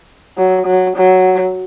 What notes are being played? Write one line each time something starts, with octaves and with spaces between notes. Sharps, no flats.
F#3
F#3
F#3